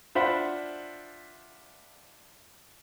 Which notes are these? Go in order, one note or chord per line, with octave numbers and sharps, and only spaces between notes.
D4 F4 C5 E5 F#5 B5